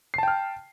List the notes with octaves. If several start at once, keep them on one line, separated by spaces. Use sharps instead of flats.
G5 A5 F6 C7